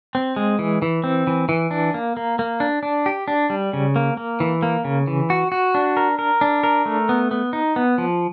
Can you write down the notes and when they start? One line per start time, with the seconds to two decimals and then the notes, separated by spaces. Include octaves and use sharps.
0.15 C4
0.36 G#3
0.59 E3
0.82 E3
1.04 C4
1.27 E3
1.49 E3
1.71 D4
1.94 A#3
2.17 A#3
2.39 A#3
2.60 D4
2.83 D4
3.06 G4
3.28 D4
3.50 G3
3.73 C#3
3.96 A#3
4.17 A#3
4.40 E3
4.63 A#3
4.85 C#3
5.07 E3
5.30 F#4
5.52 F#4
5.75 D4
5.97 A#4
6.19 A#4
6.41 D4
6.63 A#4
6.86 A3
7.09 B3
7.31 B3
7.53 D#4
7.76 B3
7.98 F3